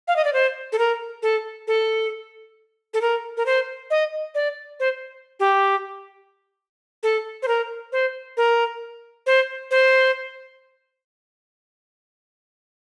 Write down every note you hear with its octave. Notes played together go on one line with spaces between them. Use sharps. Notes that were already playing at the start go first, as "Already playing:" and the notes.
F5
D#5
D5
C5
A4
A#4
A4
A4
A4
A#4
A#4
C5
D#5
D5
C5
G4
A4
C5
A#4
C5
A#4
C5
C5